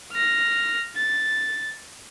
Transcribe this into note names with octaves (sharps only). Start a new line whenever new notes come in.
F6 A#6
A6